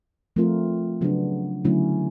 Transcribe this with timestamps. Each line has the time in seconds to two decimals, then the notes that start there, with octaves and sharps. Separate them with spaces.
0.36 F3 A3 C4 F4 A#4
1.01 C#3 F#3 B3 D4
1.65 D3 F#3 A3 C#4 E4